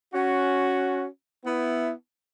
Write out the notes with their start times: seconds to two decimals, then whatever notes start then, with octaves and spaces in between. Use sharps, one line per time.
0.14 C#4 F#4
1.45 B3 E4